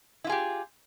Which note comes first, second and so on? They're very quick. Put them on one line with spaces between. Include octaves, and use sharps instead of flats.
E4 F4 G#4 G4